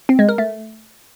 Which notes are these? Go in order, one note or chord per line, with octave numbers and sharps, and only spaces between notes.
C4
G#3
A#4
A3